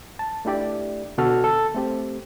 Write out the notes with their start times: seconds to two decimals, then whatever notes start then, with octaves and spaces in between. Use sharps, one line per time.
0.19 A5
0.45 A3 D4 E4 G4 D5
1.18 B2 D3 F#4 A4 F6
1.44 A4
1.75 A3 C4 G4